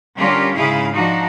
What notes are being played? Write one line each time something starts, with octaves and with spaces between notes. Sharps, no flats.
D3 G3 C#4 F4 G4 A#4
G#2 C#3 E4 G#4 F5
F3 D4 D#4 F#4